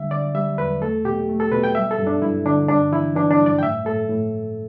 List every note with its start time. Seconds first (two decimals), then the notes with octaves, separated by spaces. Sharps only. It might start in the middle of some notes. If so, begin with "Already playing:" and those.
Already playing: D3 G3 E5
0.11 D3 D5
0.35 G3 E5
0.58 E2 B4
0.82 A3 A4
1.05 B2 G4
1.29 A3
1.40 A4
1.52 B2 B4
1.64 G5
1.75 G3 E5
1.91 A4
1.99 G2
2.07 D4
2.22 G2 E4
2.46 D3 D4
2.69 G2 D4
2.92 E3 E4
3.16 E3 D4
3.31 D4
3.39 G2
3.46 D5
3.58 G5
3.63 A2 E5
3.85 A2 A4
4.09 A2